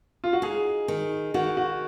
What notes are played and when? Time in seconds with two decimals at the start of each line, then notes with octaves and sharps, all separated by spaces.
0.24 F4
0.33 F#4
0.42 D#4 G#4
0.88 D#3
1.34 D#3 F#4
1.57 F#4